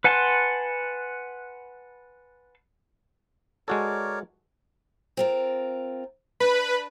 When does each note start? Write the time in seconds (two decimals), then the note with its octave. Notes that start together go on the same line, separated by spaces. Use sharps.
0.04 B4 F#5 G#5 A5 C6
3.68 G#3 F#4 A4 A#4 C#5 D5
5.17 C4 F4 A#4
6.40 D4 B4 B5